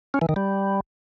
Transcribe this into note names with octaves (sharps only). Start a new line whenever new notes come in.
C#4
E3
D#3
G3